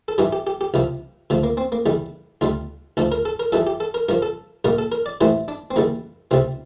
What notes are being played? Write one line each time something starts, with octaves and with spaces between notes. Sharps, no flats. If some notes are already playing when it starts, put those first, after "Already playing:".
A4
G2 E3 G3 G4
G4
G4
G4
C2 C3 F3
D2 D3 F3
A#3
C4
A#3
E2 D3 G3
D2 D3 G3 F4
D2 D3 F3 A4
A#4
A4
A#4
F2 E3 G3 A4
G4
A4
A#4
G2 F3 A#4
A4
A#1 A#2 G3 A#4
A4
A#4
D5
A1 A2 E3 G3 C5
D4
C4
E2 D3 G3 A#3
C2 C3 G3 C4